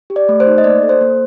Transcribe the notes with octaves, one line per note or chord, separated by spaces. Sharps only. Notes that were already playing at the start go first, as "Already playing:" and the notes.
G4
D5
A3
C5
D#4
D#5
A#3 D5
A4
C5
A#3